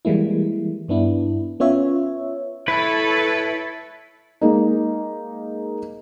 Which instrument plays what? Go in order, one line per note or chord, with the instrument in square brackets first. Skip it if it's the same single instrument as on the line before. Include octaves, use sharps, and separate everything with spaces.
[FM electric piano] E3 G3 G#3 A#3 E4
G2 B3 D4 E4
B3 C#4 F4 C#5 E5
[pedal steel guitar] E4 [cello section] A4 C#5 [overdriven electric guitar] B4
[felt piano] G#3 A#3 D#4